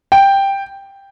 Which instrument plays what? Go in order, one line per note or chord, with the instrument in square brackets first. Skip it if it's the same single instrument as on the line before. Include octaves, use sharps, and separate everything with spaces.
[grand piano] G5